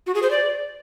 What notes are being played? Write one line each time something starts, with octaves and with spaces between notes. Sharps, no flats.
F#4
G#4
C5
D5